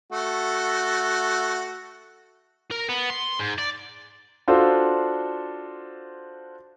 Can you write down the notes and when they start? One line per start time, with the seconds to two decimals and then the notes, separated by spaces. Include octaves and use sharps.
0.12 A3 F#4
2.71 A#4
2.89 B3
3.10 C6
3.39 G#2
3.58 D5
4.48 D4 F4 F#4 A4 C5